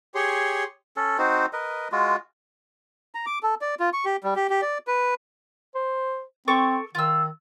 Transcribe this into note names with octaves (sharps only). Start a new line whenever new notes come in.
G4 G#4 C#5 C6
C#4 A4
C4 D#4 F#4 C5
A#4 B4 D#5
G#3 F4 F#4
A#5
D6
A4
D5
F4
C#6
G4
G3
G4
G4
D5
B4
C5
C4 A4 C#6 D6
D#3 F4 E6